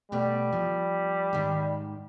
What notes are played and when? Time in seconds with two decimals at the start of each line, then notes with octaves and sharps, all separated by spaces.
0.12 B2 G3 A3 D5
0.52 F3
1.33 G#2 D#3